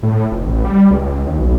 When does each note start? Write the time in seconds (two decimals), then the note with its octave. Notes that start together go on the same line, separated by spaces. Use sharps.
0.03 A2
0.32 F1
0.46 A1
0.65 G3
0.91 C#2
1.27 D#2
1.39 B1